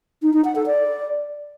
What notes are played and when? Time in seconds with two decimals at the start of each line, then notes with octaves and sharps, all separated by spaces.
0.22 D#4
0.33 D#4
0.44 F#5
0.55 A4
0.66 D5